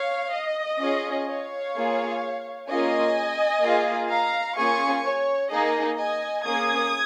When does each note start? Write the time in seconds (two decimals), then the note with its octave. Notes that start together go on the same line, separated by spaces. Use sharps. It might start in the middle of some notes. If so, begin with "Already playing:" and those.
Already playing: C#5 F5
0.33 D#5
0.80 C#4 F4 G#4
1.26 C#5 F5
1.75 A#3 F4 G#4
2.68 A#3 C#4 F4 G#4 D#5 G#5
3.62 A#3 F4 G#4
4.10 F5 A#5
4.56 A#3 C#4 F4 G#4 G#5 C#6
5.04 C#5
5.51 A#3 D#4 G#4 D#5
5.98 D#5 G#5
6.45 A#3 C#4 G#4 D#6 G#6